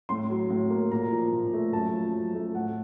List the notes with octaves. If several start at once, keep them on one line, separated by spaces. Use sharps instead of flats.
A2 C6
F#3
A2
A#3
A#2 A#5
F3
A#2
A3
F#2 A5
F3
F#2
A3
A2 F#5